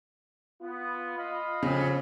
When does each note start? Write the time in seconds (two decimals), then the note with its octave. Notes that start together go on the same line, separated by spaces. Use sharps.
0.62 B3 F4
1.17 D#5 F5 B5
1.63 F2 C#3